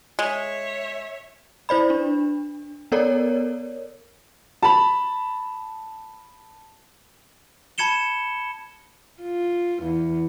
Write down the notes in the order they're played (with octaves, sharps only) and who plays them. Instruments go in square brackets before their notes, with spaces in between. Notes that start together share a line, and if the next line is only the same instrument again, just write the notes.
[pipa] G#3 [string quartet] C#5 E5
[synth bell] E4 C5 D5 B5
D4
B3 A4 A#4 C#5 D5
[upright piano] A5 B5
[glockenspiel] A5 B5 G#6 C#7 E7 G7
[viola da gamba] F4
E2